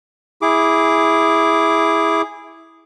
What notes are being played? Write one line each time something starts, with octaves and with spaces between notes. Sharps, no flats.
E4 G#4 D6